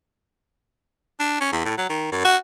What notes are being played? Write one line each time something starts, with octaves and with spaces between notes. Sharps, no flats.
D4
C#4
E2
A2
F#3
D#3
F#2
F#4